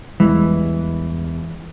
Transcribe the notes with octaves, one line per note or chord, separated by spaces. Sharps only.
E2 E3 G3 G#3